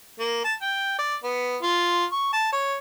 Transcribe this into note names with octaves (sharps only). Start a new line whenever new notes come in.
A#3
A5
G5
D5
B3
F4
C#6
A5
C#5